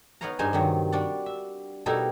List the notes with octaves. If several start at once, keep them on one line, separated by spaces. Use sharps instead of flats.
B3 D#4 B4 C#5 F5 A#5
G2 D#4 G#4 C5 F5 G#5
G2 C3 D#3 F#3
G3 D4 F#4 D5
E5
B2 G3 A3 D#4 E4 A#4